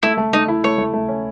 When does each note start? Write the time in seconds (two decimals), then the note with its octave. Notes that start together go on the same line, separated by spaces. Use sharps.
0.03 A3 E4
0.17 A3
0.33 A3 D#4
0.48 E4
0.64 A3 C#5
0.78 A3
0.94 A3
1.08 C#4